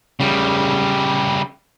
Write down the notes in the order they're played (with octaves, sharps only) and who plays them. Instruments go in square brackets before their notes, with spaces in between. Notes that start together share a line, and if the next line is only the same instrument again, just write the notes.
[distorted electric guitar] C#3 G3